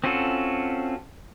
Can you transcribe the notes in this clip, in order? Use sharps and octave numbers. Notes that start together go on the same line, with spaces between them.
C4 C#4 F4 F#4 A4